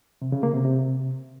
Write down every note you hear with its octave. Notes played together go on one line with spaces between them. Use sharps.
C3
C#3
A#3
C3
C3